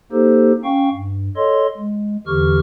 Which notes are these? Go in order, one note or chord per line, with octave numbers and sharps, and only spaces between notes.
A#3 D#4 G4 A4 C5
C#4 F5 G5 C#6
G2
A4 C#5 D#5 C6
G#3
E2 D3 E3 G4 C#6 F6